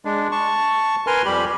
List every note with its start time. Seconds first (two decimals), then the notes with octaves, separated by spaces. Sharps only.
0.05 G#3 D4
0.32 A5 C#6
1.07 A#4 B4 G#5 C6 F6
1.25 F2 G3 G4 B5